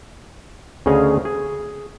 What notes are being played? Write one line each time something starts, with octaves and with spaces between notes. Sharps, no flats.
D2 C#3 C#4 G#4 D#5 F5
G#4